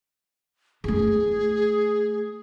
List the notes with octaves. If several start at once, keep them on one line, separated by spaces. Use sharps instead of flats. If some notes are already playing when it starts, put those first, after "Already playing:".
A3 E4 G#4